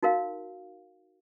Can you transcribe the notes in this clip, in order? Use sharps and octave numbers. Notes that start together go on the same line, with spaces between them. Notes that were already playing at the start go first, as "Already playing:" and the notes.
D#4 F#4 A#4 F5